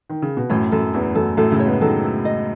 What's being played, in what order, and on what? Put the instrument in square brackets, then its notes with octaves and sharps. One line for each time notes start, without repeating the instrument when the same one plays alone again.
[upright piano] D#3
C#3
B2
[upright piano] F#2 A2 [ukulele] C#5
[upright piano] F#2 [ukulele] A4
[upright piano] E2 [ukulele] E4
[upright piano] F#2 [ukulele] A4
[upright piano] F#2 A2 [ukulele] A4
[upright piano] A2 C#3
[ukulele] C#5
[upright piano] G#3 B3
[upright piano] D#3 F#3 [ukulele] A4
[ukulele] E4
D#5